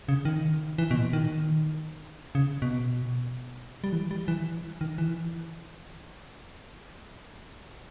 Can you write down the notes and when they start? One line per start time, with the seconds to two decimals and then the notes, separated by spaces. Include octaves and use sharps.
0.08 C#3
0.25 D#3
0.78 E3
0.91 B2
0.96 A#2
1.13 D#3
2.35 C#3
2.62 B2
3.84 G3
3.92 E3
4.11 G3
4.28 E3
4.81 D#3
4.98 E3